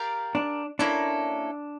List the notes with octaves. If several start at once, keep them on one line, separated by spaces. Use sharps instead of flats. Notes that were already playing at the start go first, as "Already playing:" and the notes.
Already playing: G4 A#4 D5 F5
D4
A#3 C#4 D4 E4 A4